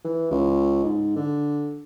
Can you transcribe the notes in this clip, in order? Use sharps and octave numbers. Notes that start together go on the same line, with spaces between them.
E3
C#2
G#2
D3